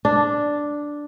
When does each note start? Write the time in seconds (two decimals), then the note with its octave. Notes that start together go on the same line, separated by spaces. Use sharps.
0.05 D4